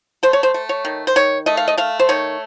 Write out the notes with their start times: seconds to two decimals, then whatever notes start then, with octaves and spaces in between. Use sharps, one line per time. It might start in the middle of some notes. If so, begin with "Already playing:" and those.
0.23 A3 C5
0.33 C#5
0.43 C5
0.54 A3
0.69 C#5
0.85 D#3
1.07 C5
1.16 D#3 C#5
1.46 A3 D#5
1.57 F5
1.68 D#5
1.78 A3 F5
2.00 C5
2.09 D#3 C#5